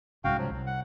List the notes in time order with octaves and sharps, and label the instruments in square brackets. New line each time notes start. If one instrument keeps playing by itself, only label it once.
[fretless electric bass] C2 G#2 C#3 [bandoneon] F#4 F5 G5
[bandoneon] F3 F#3
[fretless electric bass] C2 [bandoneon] F#3
[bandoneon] F#5